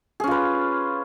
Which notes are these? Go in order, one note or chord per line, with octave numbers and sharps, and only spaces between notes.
C#4 F4 G#4 B4